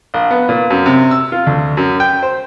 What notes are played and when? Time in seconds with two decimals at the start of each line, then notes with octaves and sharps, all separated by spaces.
0.14 A#1
0.31 B3
0.49 A#2
0.70 F#2
0.86 C3
1.11 E6
1.32 F4
1.47 D2
1.77 F#2
2.00 G5
2.23 C5